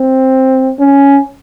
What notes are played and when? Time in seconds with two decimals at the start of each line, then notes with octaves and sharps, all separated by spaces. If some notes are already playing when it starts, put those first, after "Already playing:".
Already playing: C4
0.80 C#4